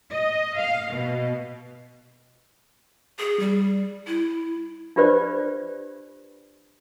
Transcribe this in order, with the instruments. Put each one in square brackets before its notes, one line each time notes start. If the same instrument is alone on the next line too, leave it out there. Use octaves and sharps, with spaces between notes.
[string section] D#5
F5
B2
[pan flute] G#4
G3
E4
[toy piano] D4 F4 G4 B4 C5 D5